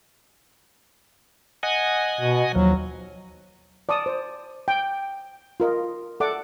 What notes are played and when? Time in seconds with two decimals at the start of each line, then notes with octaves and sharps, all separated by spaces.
1.63 D#5 F#5 G#5
2.21 B2
2.55 D#2 F3 F#3
3.89 D5 A5 C#6 D#6
4.06 C5
4.68 G5
5.60 F4 A#4 D#5
6.20 A4 D5 E5 F#5 D6